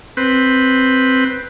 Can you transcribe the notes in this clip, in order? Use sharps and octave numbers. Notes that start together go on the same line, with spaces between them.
C4 B4